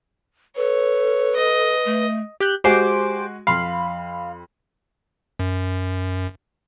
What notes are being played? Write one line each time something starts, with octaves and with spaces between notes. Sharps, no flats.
A4 B4 C#5
D#5
A3
G4 F#6 G6
G#3 F#4 G4 C5 G#5 D6
F2 F5 B5 C6
F#2